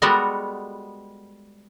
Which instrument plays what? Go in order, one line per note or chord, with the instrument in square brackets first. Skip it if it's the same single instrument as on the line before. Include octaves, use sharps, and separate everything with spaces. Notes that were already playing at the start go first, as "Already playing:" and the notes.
[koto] G3 G#3 B3 F#4 A4 A#4